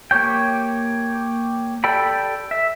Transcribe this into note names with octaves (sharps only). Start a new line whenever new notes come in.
A#3 G4 C#5 G5
G4 A4 D5 G5 B5
E5